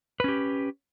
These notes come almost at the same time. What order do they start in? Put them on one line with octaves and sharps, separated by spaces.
B4 C#4 G4